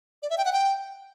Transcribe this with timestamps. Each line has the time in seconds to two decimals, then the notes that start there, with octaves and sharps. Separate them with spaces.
0.23 D5
0.30 E5
0.38 G5
0.45 F#5
0.53 G5